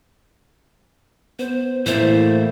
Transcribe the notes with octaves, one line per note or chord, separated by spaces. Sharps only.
B3 C5
A2 E3 A3 A#3 E4 C5